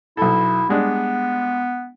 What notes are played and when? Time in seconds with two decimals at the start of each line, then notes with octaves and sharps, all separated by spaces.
0.17 B1 E4 A4
0.69 G3 G#3 B3 D4